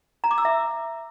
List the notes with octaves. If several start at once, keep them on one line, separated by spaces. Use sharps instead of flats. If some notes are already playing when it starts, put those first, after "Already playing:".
A#5
D6
E6
E5